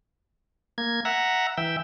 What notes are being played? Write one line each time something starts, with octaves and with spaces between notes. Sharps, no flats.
A#3 G#6
E5 F#5 A#5
E3 E5 G5